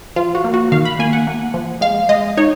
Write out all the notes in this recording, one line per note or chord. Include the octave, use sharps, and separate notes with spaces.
F3 F4
F#4
A#3
F#4
D#3 F5
B5
A#3 G#5
F#5
A#3
F3
G#3 F5
G#3 D#5
D#4 C#5